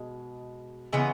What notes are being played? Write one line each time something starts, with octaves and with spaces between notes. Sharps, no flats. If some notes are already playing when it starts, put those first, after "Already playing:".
Already playing: B2 G#3
C#3 E3 G#3 B3